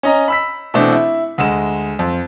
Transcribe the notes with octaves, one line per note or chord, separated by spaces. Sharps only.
C#4 D#5 A#5
B5 E6 B6
B2 E3 A3 C4 D4
E4
D2 G#3 E7
F2